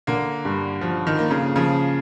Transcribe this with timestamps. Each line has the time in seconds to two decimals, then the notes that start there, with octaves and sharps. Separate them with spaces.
0.07 D3 A#3
0.45 G2
0.81 F3
1.07 D#3
1.19 A#3
1.30 C#3
1.56 C#3 F3